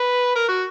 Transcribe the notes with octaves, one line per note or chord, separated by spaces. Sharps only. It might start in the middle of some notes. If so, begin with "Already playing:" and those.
Already playing: B4
A#4
F#4